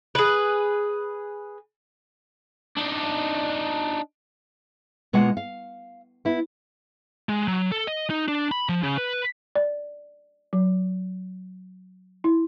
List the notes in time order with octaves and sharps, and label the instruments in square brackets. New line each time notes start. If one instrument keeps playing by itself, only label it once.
[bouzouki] G#4 B4
[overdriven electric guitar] D4 D#4
[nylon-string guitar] B2 G#3 A#3 F4 F#5
F5
B3 E4
[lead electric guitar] G#3
F#3
A4
D#5
D#4
D4
B5
F3
C#3
B4
[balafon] D5
F#3
E4